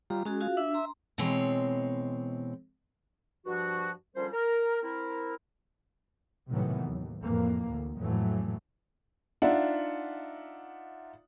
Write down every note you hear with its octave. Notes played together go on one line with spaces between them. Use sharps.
G3 F4 A#5
G#3 C#4 F#4 G#4
F4 F#4 F5
D4 E5
A#5 C6
B2 E3 G#3 C4 C#5
G2 F3 F#4
D3 F3 G3 C#4 A#4 C5
A#4
C4 E4 A#4
A2 C3 D#3 E3 F#3 B3
D#2
F2 A2 E3 A#3
D2
F2 A2 E3 F#3 A3
D4 D#4 F4 E5 F#5